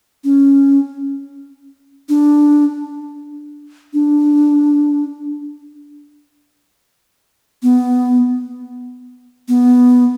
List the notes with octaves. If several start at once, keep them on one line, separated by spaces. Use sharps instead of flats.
C#4
D4
D4
B3
B3